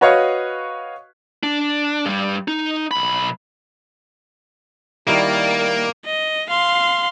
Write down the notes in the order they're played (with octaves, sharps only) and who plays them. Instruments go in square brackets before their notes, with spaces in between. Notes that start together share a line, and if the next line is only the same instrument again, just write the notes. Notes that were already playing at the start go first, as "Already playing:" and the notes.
[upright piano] F#4 B4 C#5 D#5 F5 C#6
[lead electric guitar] D4
G2 G3
D#4
B1 B5
[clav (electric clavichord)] D#3 G3 E4 [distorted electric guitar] A#3 [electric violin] A#4 D5
[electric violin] D#5
F5 C6